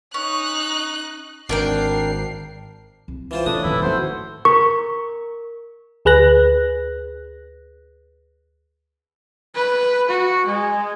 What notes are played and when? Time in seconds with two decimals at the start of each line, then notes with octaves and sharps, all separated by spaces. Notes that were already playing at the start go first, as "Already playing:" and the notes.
0.14 C#4 D#4 F#6
1.49 G#1 D4 A#4 G5 C7
3.08 C2
3.31 E3 F4 C5
3.46 A2 C#3 C#4 D4 D#6
3.64 D#1 G#1 C#3 E3 E4 B4
3.82 G#2 D#3 E4 F#4 A4 C5
4.45 A#4 C#6
6.05 D2 G#4 B4 F#6 A#6
9.55 B4
10.09 F#4
10.46 G#3